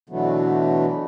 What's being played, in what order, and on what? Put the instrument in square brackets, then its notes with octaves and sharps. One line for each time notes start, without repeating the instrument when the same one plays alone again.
[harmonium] B2 D3 E3 F#3 A3 B3